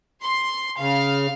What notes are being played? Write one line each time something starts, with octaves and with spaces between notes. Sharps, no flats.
C6
C#3 F5